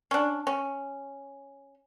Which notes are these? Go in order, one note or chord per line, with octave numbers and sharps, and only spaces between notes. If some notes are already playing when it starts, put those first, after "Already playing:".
C#4 D4
C#4